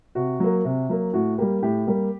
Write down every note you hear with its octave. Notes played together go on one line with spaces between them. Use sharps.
C3 F#4
F#3 A#3
C3
F#3 A#3
A2 F#4
G3 A#3 G4
A2 G4
G3 A#3